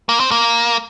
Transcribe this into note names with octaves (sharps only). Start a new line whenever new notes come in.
A#3
C4
A#3